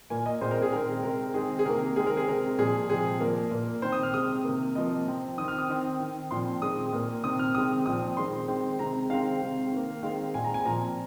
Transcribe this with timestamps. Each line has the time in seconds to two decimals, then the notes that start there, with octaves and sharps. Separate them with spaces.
0.10 A#2 A#3 G#5
0.26 D#5
0.41 A#2 G#3 C4 C5
0.51 A#4
0.62 G#4
0.72 D#3 G#3 C4 A#4
1.03 C3 G#3 C4 A#4
1.34 D#3 G#3 C4 G#4
1.59 G#4
1.65 C3 D#3 A#3 A#4
1.96 D#3 G#3 C4 G#4
2.07 A#4
2.17 G#4
2.27 C3 G#3 C4 A#4
2.58 A#2 F3 G#3 G#4
2.90 C3 F3 G#3 C4 G#4
3.20 A#2 F3 A#3 A#4
3.51 A#2 A#3
3.82 D#3 C4 C5
3.92 D#6
4.03 F6
4.13 C3 G#3 C4 D#6
4.44 C3 D#3 A#3
4.75 C3 F3 A#3 D#5
5.07 C3 F3 C4
5.38 D#3 C4 D#6
5.48 F6
5.58 D#6
5.69 D#3 C4
6.00 D#3 C4
6.31 A#2 F3 C4 C6
6.61 D#3 G#3 C4 D#6
6.93 A#2 A#3
7.24 C3 D#3 C4 D#6
7.39 F6
7.55 C3 D#3 G#3 C4 D#6
7.86 A#2 F3 C4 D#6
8.17 D#3 G#3 C4 C6
8.48 D#3 G#3 C4
8.79 C3 D#3 G#3 C4 A#5
9.10 D#3 G#3 C4 F5
9.41 C3 G#3 C4
9.72 D#3 A#3
10.03 D#3 G#3 C4 F5
10.34 A#2 G#3 C4 G#5
10.44 A#5
10.54 G#5
10.65 A#2 F3 C4 A#5